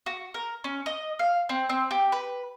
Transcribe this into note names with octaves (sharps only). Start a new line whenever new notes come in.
F#4
A#4
C#4
D#5
F5
C4
C4
G4
B4